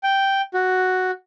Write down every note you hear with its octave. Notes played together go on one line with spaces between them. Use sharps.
G5
F#4